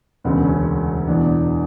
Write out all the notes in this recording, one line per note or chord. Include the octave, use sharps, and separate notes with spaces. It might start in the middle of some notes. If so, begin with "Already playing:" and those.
E1 D2 C#3 B3
C#4
E1 E2 B2 D4